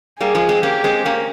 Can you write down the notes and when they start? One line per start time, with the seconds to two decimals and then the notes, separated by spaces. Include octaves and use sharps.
0.20 G3 A#3 G#4
0.35 F3 G#3
0.49 G#3 C4
0.63 A#3 C#4 G4
0.84 G#3 C4
1.05 A#3 C#4